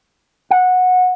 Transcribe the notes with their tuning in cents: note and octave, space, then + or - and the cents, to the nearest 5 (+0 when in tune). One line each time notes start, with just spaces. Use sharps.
F#5 -15